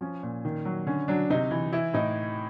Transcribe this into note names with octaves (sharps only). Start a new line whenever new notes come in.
F3 C#4
A#2
D#3
F#3
D3 C#4
F#3 D4
C3 D#4
E3
E3 E4
A2 D#4